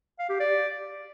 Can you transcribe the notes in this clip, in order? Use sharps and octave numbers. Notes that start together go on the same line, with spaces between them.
F5
G4
D5